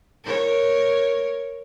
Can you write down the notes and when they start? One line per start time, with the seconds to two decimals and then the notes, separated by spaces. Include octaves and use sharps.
0.24 A#4 C#5